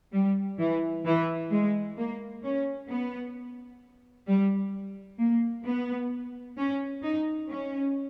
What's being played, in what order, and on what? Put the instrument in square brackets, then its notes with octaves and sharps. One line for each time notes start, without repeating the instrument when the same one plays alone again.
[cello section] G3
E3
E3
G#3
A#3
C#4
B3
G3
A#3
B3
C#4
D#4
C#4